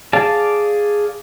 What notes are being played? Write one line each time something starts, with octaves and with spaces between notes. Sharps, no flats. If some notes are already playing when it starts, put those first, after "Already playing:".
G#4 D5 F5 A5